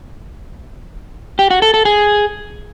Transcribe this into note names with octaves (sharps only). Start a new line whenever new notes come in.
G4
F#4
A4
A4
G#4